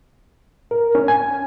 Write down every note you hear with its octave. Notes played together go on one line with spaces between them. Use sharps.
A#4
C#4
G#5